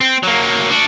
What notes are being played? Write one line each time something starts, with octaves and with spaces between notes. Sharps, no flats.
C4
F#3 A#3
D4 F#4